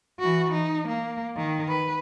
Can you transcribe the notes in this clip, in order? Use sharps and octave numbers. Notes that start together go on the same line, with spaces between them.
E3 F#4
D#4
A#3
D#3
B4